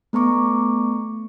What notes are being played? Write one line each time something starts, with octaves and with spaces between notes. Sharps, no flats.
A3 B3 A#5 C#6 D6